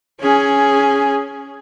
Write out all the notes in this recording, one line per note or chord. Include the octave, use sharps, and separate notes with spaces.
C#4 G#4